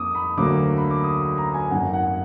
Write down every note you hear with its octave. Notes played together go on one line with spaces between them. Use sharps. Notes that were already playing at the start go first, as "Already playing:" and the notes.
Already playing: F2 F3 A#3 D#4 D6 D#6
B5
D2 D3 F#3 A#3 D6
B5
D6
D#6
B5
A#5
G#5
G#1 F#2 D#3 A#3 F#5
F#5